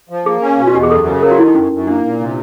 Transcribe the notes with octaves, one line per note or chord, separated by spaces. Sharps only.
F3
A#3 G#4
C#4
B2
F#4
E2 G4
G#4
F#2 A4
C#3
F#3 A#4
F#4
D#3 E4
D#4
F#2 C#4
F#2
A#3 D4
A#2
C3